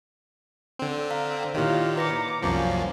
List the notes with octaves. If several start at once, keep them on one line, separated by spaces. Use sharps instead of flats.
D3 C4
F5 A#5
A#2 D#3 E4 F4 G4 C#5
B4 A#5 D6 A#6 C#7
C2 F#2 F3 A#3 C#4